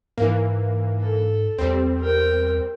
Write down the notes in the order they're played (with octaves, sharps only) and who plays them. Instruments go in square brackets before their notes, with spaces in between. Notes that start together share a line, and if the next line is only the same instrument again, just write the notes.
[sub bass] G#2 [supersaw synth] E3 A#3
[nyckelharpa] A4
[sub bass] E2 [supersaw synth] G3 C4
[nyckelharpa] A#4 G5